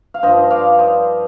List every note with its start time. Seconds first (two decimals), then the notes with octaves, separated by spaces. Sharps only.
0.14 F5
0.23 G2 F3 C5 D#5
0.50 D5 F5
0.79 C5 D#5